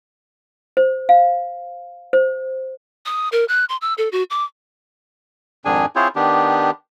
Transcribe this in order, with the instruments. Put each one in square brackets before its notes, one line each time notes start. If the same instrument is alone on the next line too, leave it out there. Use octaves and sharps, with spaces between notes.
[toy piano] C5
F5
C5
[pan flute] D#6
A#4
F#6
C6
E6
A4
F#4
D6
[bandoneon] F2 G#2 D#3 D4 G#4 G#5
C4 E4 F4 G#4 C5 C#5
D#3 B3 D4 G4